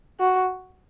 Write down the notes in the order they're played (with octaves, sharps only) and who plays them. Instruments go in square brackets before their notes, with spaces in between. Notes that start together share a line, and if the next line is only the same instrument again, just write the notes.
[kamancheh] F#4